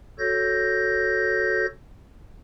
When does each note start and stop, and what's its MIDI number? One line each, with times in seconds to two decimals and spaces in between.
0.19 1.66 66
0.19 1.66 69
0.19 1.66 73
0.19 1.66 91
0.19 1.66 94